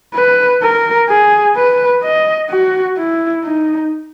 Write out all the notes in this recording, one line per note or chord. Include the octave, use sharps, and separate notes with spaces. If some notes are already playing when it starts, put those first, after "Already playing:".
B4
A#4
G#4
B4
D#5
F#4
E4
D#4